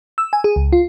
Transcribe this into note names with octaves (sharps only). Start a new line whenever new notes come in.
E6
G#5
G#4
C#2
F4